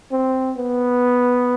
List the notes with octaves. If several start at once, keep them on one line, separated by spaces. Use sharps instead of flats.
C4
B3